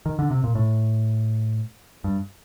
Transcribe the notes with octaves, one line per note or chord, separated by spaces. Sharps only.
D#3
D3
C3
A#2
A2
G2